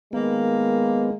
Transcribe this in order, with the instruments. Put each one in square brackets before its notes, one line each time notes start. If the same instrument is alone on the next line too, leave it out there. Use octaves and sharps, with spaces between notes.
[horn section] D#3 A#3 [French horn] G#3 [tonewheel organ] B3